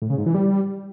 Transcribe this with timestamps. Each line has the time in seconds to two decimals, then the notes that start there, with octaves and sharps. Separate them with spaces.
0.02 A2
0.10 C#3
0.18 G#2
0.26 E3
0.34 G3